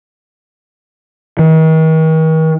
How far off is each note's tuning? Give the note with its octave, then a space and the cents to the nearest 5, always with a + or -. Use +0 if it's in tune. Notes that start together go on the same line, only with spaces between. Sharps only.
D#3 +45